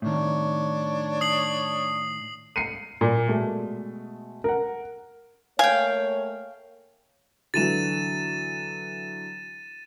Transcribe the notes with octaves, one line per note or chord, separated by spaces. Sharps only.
A2 D#3 D4 C#5
D#6 C7 F#7
C7 C#7 D#7
A#2
B2 G#3 A3
A#4 F#5
A3 A#3 C#5 F5 G5 G#5
D3 E3 F#3 A6 D#7 E7